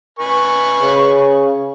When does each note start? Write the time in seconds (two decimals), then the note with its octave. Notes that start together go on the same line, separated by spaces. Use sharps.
0.19 B4 G#5 C#6
0.82 C#3